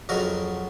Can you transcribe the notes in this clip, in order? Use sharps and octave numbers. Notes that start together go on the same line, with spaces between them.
F2 C#3 F#3 F#4 A#4